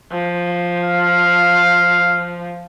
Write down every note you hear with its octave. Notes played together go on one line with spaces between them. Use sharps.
F3
F5